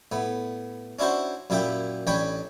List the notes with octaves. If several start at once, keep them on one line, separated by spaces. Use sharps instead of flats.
A2 B3
C#4 D4 E4 F#4 C5
F#2 A#2 E4 G4 G5 B5
A1 D4 C#5 G5 G#5 B5